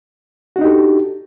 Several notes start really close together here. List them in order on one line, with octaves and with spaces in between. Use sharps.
F#4 D4 D#4 G4 A4